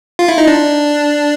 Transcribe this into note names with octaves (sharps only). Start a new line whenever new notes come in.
F4
E4
D#4
D4